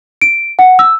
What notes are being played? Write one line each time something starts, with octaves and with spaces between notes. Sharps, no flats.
D7
F#5
E6